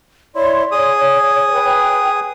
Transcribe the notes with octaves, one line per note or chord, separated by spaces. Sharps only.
E4 C#5 D5 C6
G#4 C#5 D#6
B4 G5